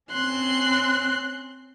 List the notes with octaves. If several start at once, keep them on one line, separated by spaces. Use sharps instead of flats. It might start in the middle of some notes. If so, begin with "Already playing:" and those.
C4 C#4 C6 F#6